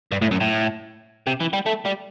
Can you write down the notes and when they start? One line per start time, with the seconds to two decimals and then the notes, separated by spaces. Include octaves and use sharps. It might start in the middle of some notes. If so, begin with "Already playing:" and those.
0.12 G2
0.22 A2
0.31 F#2
0.41 A2
1.27 C3
1.40 E3
1.53 G3
1.66 A3
1.85 G3